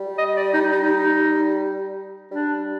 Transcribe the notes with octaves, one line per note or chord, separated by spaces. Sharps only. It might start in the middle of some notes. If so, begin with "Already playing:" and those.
Already playing: G3
D#5
D5
D#4
D#4
D#4
G3 D4